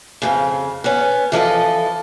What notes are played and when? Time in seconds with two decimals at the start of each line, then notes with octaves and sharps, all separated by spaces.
0.22 F2 A2 C#3
0.84 B3 C#4
1.32 E3 F3 A4 D#5